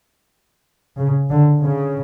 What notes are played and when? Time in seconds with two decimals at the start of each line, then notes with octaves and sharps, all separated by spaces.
0.97 C#3
1.31 D3
1.63 C#3